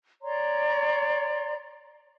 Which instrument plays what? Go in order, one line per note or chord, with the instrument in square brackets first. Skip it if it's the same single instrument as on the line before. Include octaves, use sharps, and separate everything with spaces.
[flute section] C#5 D5 A#5 C6